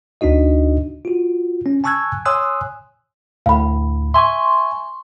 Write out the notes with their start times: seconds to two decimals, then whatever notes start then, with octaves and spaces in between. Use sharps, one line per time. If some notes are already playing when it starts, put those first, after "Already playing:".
0.21 D2 D4 D#4 F#4 D#5
1.05 F4 F#4
1.66 C#4
1.84 G#5 A5 C#6 E6 F#6 G#6
2.25 C#5 G#5 C6 D#6 E6 F#6
3.46 D2 A2 F5 B5
4.14 E5 G#5 C6 C#6